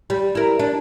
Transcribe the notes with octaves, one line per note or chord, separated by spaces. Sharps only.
G3
E4 A#4
D4